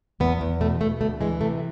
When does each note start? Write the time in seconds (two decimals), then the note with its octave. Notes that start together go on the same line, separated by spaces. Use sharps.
0.20 E2 B3
0.41 E2
0.61 B2 A3
0.80 B2 A3
1.01 D2 A3
1.21 E3 G#3
1.41 C3 A3